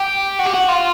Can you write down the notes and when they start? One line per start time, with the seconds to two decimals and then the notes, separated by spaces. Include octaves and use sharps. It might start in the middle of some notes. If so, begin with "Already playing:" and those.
Already playing: G4
0.39 F#4
0.46 G4
0.54 F#4
0.69 F4